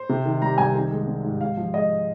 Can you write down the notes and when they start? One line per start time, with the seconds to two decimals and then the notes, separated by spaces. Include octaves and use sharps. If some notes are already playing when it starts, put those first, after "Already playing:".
Already playing: C5
0.09 C3
0.25 D#3
0.42 G3 A#5
0.58 C2 G#5
0.75 D#3
0.91 G#3
1.07 C4
1.24 G#2
1.41 G#2 F5
1.57 F3
1.74 G#3 D#5